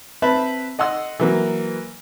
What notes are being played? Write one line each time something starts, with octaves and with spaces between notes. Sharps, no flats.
C4 B4 E5 A5 B5
D#5 F#5 C6 E6
E3 F#3 A#3